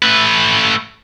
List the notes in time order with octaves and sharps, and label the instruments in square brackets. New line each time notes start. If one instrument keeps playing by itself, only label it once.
[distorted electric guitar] A3 B4